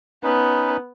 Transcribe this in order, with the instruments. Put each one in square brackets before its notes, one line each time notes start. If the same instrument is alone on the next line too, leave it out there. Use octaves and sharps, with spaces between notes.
[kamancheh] B3 [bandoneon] C#4 D#4 B4